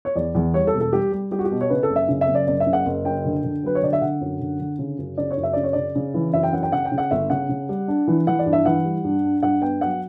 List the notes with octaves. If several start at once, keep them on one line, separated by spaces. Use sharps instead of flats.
C#5
E2 D5
E2
G3 C#5
A4
E1
A4
G3 G4
G3
G3 G4
F#4
G4
B2
C#5
C#3 B4
A4
F#1
E5
C#3
E5
F#1
D5
F#1 D5
E5
C#3
F#5
F#1
F#2 G5
D3
D3
F#3 B4
C#5
D3 D5
E5
D3 F#5
F#2
D3
D3
C#3
F#2
C#3 D5
C#5
F#2
E5
C#3 D5
C#5
C#3 D5
C#3
E3
F#2 E5
G5
F#2 F#5
G5
C#3 F#5
G5
C#3
F#5
G1 E5
C#3 F#5
C#3
G3
D4
E3
E3 F#5
D5
G2
E5
E3 F#5
G3
G2
D4
G2 F#5
B3 G5
F#3 F#5